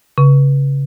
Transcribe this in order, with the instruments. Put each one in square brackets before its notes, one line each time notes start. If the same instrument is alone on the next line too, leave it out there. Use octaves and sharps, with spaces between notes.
[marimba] C#3